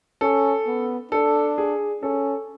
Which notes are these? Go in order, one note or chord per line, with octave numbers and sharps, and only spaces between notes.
C#4 A4
B3
D4 A4
G#4
C#4 A4